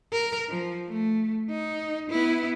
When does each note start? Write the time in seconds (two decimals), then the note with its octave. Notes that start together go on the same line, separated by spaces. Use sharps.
0.13 A#4
0.49 F3
0.89 A3
1.50 D#4
2.10 B3 E4